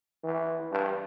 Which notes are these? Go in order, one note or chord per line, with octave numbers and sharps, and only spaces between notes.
E3
G2